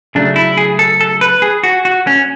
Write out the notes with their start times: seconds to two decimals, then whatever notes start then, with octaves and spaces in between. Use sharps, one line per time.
0.15 C#3 F#3 A3 D4
0.36 E4
0.57 G#4
0.79 A4
1.01 A4
1.21 B4
1.42 G#4
1.64 F#4
1.85 F#4
2.07 C#4